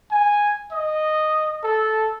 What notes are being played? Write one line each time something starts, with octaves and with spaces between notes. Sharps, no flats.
G#5
D#5
A4